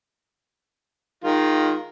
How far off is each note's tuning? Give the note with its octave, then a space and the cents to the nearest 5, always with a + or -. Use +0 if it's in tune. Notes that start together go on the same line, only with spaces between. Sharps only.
D#3 +0 G#3 +0 F4 +5